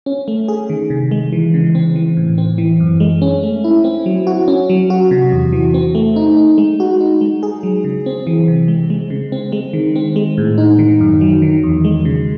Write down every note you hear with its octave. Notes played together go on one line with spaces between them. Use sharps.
C#4
A3
G#4
D#3
C3
G#3
E3
C#3
C4
E3
A2
C4
E3
F#2
G#3
C#4
A3
E4
C4
F#3
F#4
C#4
F#3
F#4
C3
E2
E3
C4
A3
D#4
D#4
G#3
F#4
D#4
G#3
G#4
F#3
C#3
C4
E3
C3
G#3
G#3
C#3
C4
G#3
D#3
C4
G#3
A2
D#4
D#3
F#2
F#3
D#3
E2
G#3
C#3